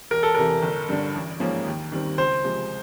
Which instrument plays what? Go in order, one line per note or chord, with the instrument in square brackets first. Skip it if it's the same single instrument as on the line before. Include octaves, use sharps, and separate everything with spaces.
[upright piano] E1 [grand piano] A#4
[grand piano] A4
[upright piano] E2 C3 E3 [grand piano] A#4
[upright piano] G1
G2 D3
A1
G#2 F3 A#3 C#4
D#2
D#3 G3 C4
[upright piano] C#2 [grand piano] C5
[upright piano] C3 F3 G#3